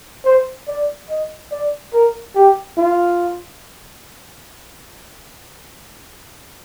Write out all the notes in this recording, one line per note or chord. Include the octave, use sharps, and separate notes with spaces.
C5
D5
D#5
D5
A#4
G4
F4